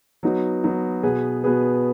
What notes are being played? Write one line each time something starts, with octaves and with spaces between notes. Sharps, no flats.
F#3 B3 D#4
F#3 B3 D#4
B2 B3 G#4 B4
B2 B3 G#4 B4